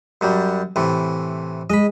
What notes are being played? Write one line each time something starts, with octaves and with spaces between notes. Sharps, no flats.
F#2 F#3 G3
A2 C3 E3
G#3 D#5 B5